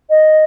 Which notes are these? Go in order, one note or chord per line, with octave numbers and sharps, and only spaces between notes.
D#5